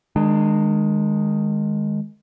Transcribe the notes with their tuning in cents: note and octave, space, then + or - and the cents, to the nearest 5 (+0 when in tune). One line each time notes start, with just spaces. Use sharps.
D#3 +0 G#3 +0 D4 +30